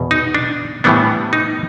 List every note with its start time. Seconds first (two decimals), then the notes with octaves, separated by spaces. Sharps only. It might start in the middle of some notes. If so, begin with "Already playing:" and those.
Already playing: E2 B2
0.11 D#4
0.35 D4
0.84 A2 E3 G3 B3 D4
1.33 D#4